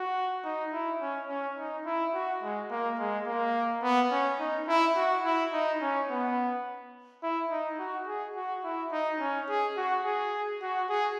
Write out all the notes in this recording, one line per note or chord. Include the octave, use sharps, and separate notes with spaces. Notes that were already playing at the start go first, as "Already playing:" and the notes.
Already playing: F#4
D#4
E4
C#4
C#4
D#4
E4
F#4
G#3
A#3
G#3
A#3
B3
C#4
D#4
E4
F#4
E4
D#4
C#4
B3
E4
D#4
F#4
G#4
F#4
E4
D#4
C#4
G#4
F#4
G#4
F#4
G#4